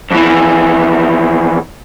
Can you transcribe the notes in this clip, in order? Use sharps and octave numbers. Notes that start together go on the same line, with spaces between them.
F2 E3